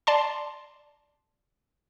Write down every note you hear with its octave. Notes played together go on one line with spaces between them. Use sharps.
D5 A5 C6